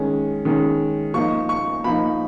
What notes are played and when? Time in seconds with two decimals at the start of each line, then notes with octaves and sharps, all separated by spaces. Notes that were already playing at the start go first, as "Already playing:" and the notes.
Already playing: D#3 G#3 C#4
0.45 D#3 G#3 C#4
1.14 F3 A#3 D#4 C#6
1.49 C#6
1.84 F3 A#3 D#4 B5